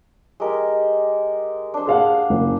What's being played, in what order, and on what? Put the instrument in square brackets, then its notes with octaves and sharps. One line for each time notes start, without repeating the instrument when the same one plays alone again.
[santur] G#3 G4 A#4
D4 C5
[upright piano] G#4 F5 F#5
F#1